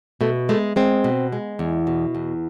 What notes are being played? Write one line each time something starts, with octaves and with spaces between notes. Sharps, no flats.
B2 A3
G#3 A3
G#3 C4
B2
G#3
E2
B2
E2